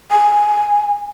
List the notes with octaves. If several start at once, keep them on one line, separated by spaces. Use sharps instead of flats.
G#5